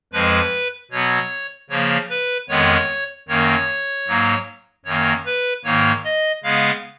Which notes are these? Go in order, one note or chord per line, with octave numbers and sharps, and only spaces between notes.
F2 F3 G#3 B4
B2 F#3 B3 C#5
C#3 F3 A#3 C#5
B4
F2 D#3 G#3 B3 C#5
F#2 D#3 A#3 C#5
G#2 F#3 A#3
F#2 D#3 A#3 C#5
B4
G#2 D#3 A#3 C#5
D#5
C#3 G#3 B3 F5